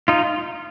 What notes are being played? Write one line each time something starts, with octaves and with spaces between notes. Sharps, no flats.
D#4 F4